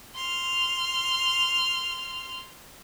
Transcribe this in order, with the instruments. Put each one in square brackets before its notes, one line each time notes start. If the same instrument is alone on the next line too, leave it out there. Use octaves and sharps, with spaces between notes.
[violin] C6 F6